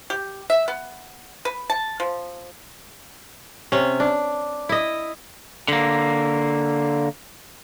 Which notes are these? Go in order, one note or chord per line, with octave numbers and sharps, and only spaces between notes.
G4
E5
B3
B4
A5
F3
C3 C#4
D4
E4 D#5
D3 A#3